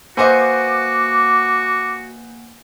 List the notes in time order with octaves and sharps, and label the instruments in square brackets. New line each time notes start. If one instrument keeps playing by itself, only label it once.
[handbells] A#3 F#5 G#5 [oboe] F#4 [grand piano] B4 C5 D#5 [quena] D6